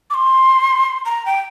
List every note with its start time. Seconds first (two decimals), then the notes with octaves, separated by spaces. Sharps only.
0.10 D6
0.14 C6
1.06 A#5
1.26 G5